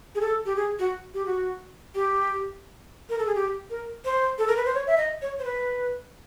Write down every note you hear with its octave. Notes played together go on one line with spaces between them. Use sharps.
G#4
A4
G4
G#4
F#4
G4
F#4
G4
A#4
A4
G#4
G4
A#4
C5
A4
A#4
B4
C5
C#5
E5
D#5
C#5
C5
B4